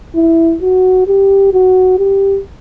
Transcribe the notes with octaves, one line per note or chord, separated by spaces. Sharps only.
E4
F#4
G4
F#4
G4